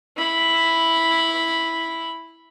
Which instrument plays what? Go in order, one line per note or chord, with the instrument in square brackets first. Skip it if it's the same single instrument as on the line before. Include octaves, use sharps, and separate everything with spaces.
[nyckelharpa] E4 B5